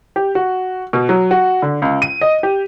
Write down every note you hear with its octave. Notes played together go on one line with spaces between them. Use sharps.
G4
F#4
B2
F#3
F#4
D3
C#2
D#7
D#5
G4